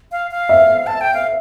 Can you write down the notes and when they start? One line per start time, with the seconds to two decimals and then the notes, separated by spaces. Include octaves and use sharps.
0.12 F5
0.31 F5
0.49 E5
0.87 A5
1.01 G5
1.14 F5